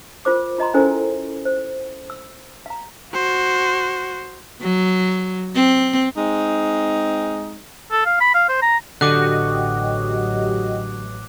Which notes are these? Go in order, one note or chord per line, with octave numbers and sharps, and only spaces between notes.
F4 A#4 C5 D6
F4 D#5 A#5 C6
C#4 E4 A4 A#4 C5 G#5
C5
E6
F5 A#5
F#4 C5
F#3
C4
G#3 C4 D#4
A4
F5
B5
F5
C5
A#5
A1 D3 F#3 F#4 G4 D#5 D6 F#6